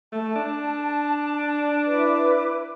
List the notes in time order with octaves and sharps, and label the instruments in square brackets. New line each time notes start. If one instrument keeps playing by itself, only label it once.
[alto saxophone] A3 [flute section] A5
[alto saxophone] D4
[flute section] E4 B4 D6